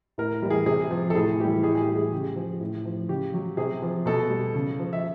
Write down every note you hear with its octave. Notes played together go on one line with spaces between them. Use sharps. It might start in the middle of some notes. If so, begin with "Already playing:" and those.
A2 A#4
E3 G3
G#4
C3 G#4
F3
A4
A2 G#4
E3 G3 G4
A2 G#4
G#4
G4
E3 G3
G#4
C#3 G4
F3
A2
F3
C#3 G4
F#3
C3 G#4
F3
B2 A4
G3
C#3
F3
E5